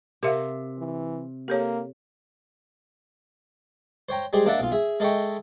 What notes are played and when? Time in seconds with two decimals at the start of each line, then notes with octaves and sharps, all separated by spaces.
0.23 C3 A#4 E5 F5
0.79 E3
1.48 A#3 G4 A4 C#5
4.09 C5 C#5 G5 A#5
4.33 G3 G#3 G4 G#4 C5
4.46 A#3 D4 D#5 E5 F#5 A5
4.60 B1 F4
4.72 G#4 E5
5.00 G#3 A4 D#5 E5 G5 C#6